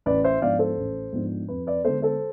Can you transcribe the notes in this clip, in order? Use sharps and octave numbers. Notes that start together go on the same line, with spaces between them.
A1 B4 D5
C5 E5
G#2 F3 B3 D4 D5 F5
A4 C5
A1
G#2 F3 B3 D4
F2 B4
B4 D5
D3 G#3 B3 A4 C5
A4 C5